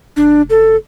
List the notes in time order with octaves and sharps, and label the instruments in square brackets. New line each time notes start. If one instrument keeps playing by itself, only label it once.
[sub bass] F1 [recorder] D4
[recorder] A4